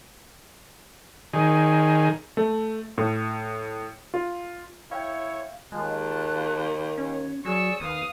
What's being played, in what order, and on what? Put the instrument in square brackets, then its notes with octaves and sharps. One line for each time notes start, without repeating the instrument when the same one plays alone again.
[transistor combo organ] D#3 G#4
[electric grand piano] A3
A2
F4
[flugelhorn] E4 [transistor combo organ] C#5 [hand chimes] F5 G5
[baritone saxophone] D#2 [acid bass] G#3 [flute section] F4 A5 F#6
[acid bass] C#4 [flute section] C#5
[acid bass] F#3 [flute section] G#4 C#5 D5 [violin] C#6 E6
[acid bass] D#2 [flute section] B4 [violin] F5 D#6